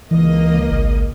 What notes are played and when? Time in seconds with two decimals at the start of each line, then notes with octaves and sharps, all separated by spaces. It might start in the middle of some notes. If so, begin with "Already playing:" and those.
0.11 C#2 E3 A#3 D#5
0.71 G#1